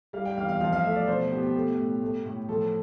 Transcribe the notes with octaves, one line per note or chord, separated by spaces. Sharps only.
G3 F5
G5
E2 F5
F5
F3 F5
F5
A3 E5
D5
B2 C5
B3 G4
G4
A3
A2
A3
A2
F3 A4